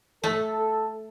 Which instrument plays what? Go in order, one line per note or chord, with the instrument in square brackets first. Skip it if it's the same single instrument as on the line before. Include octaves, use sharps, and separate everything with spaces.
[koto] A3 [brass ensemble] A4